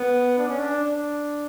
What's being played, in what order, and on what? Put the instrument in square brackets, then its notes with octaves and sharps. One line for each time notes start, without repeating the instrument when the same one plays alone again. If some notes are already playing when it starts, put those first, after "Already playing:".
Already playing: [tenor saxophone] B3
D4
C#4
D4
D4